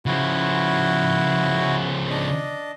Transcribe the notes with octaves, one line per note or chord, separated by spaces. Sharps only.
C#3 F3 E4 F#4
D4 D#5